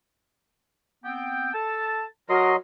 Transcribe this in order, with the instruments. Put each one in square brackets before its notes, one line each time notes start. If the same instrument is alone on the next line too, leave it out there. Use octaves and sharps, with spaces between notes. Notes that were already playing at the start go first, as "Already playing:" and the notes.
[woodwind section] B3 C4 G5
A4 A5
[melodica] F#3 D#5 C6 [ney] F#4 [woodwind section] A#4